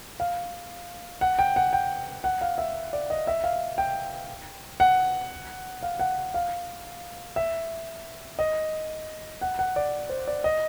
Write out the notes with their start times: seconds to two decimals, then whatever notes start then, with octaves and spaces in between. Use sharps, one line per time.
0.20 F5
1.21 F#5
1.39 G5
1.56 F#5
1.73 G5
2.24 F#5
2.41 F5
2.58 E5
2.93 D5
3.10 D#5
3.27 E5
3.44 F5
3.78 G5
4.80 F#5
5.83 F5
5.99 F#5
6.34 F5
7.36 E5
8.39 D#5
9.41 F#5
9.59 F#5
9.76 D5
10.09 C5
10.28 D5
10.44 D#5